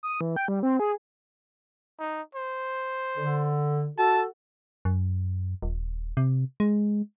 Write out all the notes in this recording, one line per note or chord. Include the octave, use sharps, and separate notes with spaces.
D#6
E3
G5
G3
C4
G#4
D#4
C5
D3
F#4 A4 A5
F#2
D#1
C3
G#3